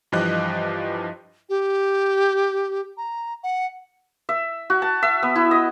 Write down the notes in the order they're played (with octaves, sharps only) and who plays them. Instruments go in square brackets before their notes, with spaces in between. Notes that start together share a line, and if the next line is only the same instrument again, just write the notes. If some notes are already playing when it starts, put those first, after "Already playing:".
[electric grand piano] G2 E3 F3 G4 D#5 F#6
[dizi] G4
A#5
F#5
[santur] E5
F#4
A5
E5
B3
E4
D#5